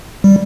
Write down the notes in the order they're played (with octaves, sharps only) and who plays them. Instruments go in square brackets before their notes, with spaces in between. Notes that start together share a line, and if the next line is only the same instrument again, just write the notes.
[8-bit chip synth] G3